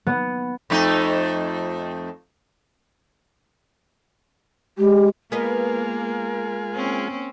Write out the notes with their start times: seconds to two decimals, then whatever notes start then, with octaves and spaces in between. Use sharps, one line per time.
0.07 B3
0.70 F2 A3 D#4
4.78 G#3 G4
5.32 G#3 A#3 B3 F4 G#4 A#4 B4 D#5
6.74 A#3 C4 C#4